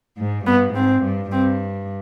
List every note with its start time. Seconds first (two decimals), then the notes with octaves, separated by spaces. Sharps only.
0.18 G#2
0.46 G2 B3
0.74 G#2 C4
1.03 G2
1.31 G2 C4